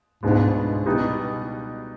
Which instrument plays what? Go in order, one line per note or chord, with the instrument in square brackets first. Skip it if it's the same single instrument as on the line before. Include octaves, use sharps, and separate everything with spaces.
[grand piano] C#2 B2 G#3 B3 D4 [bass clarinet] G#2
[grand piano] B2 G3 B3 D#4